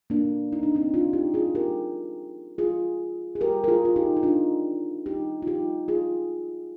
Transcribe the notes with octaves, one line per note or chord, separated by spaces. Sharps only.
A#3 D4
D#4
D4
C4 D#4
D4 F4
D#4 G4
F4 G#4
G4 A#4
F4 G#4
G#4
G4 A#4
A#4
F4 G#4
F4
D#4 G4
D#4
D4 F4
D#4 G4
F4
D#4 G4
F4 G#4